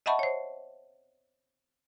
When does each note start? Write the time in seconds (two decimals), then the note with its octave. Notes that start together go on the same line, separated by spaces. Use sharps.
0.06 D#5 E5 F#5 A5 B5 C#6
0.19 C5 C#5